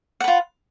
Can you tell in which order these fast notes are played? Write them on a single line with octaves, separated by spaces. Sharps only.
F#5 B4 F4